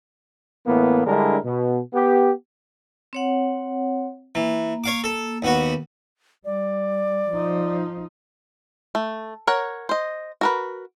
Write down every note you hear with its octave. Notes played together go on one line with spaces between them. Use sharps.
A2 E3 A#3 B3
D3 G3 G#3 D4 E4 A#4
B2
B3 G4
C4 C#5 F#5
E3 A#3
C#5 F5 D6
A4
D#2 B3 F#4
G3 D5
F3 D#4
A3
A#4 C#5 F#5
C5 D#5
F#4 A#4 B4